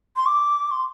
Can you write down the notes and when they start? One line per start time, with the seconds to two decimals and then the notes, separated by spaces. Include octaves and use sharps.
0.16 C6
0.26 D6
0.71 C6